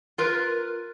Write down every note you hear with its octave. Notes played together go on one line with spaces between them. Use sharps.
F4 A#4 B4